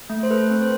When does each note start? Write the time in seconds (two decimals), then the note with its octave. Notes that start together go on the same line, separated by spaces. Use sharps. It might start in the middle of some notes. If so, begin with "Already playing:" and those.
0.10 A3
0.23 C5
0.30 A4 B4
0.50 C4
0.62 C5